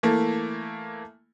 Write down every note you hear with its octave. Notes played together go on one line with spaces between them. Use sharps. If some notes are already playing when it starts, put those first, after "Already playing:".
E3 A3 A#3 A4